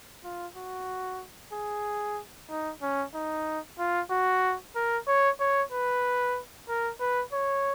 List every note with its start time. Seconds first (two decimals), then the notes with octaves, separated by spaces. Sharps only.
0.24 F4
0.56 F#4
1.53 G#4
2.50 D#4
2.82 C#4
3.14 D#4
3.79 F4
4.11 F#4
4.75 A#4
5.07 C#5
5.40 C#5
5.72 B4
6.69 A#4
7.00 B4
7.33 C#5